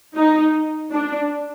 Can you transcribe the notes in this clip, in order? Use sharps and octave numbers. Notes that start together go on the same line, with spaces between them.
D#4
D4